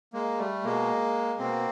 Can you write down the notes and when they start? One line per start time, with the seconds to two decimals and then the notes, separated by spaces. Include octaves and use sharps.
0.13 G#3 A#3
0.39 G3 A3
0.64 B2 G#3 A#3
1.39 B2 A#3 C4